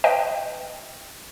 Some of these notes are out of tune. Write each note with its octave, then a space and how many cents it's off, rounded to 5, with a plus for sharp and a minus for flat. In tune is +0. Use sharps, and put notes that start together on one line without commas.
B4 +25 D#5 +0 G5 +10